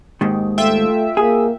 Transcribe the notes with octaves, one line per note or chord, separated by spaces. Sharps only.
D#2 G#2 D#3
A3 F4 E5 G5
A#3 G#4